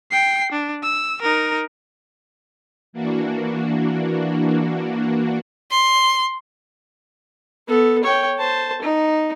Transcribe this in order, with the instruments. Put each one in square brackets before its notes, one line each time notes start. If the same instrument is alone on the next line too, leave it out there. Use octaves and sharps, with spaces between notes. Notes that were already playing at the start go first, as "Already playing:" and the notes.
[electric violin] G5 C7
D4
E6
D#4 A#4
[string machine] E3 A#3 D4 F#4
[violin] C6
[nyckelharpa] B3 A4
C#5 G5
C5 A5
D#4